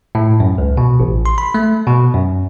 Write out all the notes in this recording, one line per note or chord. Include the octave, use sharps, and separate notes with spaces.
A2
F#2
C#2
B2
A1
C6
B5
A3
B2
F#2